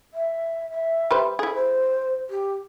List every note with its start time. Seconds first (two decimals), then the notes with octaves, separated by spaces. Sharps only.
0.14 E5
0.71 E5
1.11 G3 B4 C5
1.39 E4 G#4 A4
1.54 C5
2.30 G4